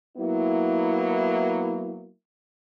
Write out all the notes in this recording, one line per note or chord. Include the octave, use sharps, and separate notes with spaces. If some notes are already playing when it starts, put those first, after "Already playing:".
F#3 A#3 B3 E4